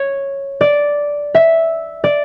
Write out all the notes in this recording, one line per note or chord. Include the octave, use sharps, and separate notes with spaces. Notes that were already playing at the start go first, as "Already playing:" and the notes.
Already playing: C#5
D5
E5
D5